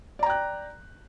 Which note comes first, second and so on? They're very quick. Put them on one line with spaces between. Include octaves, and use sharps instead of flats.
D5 A#5 G5 F#6